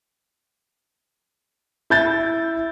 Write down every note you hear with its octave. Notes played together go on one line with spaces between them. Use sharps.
E4 G6 A6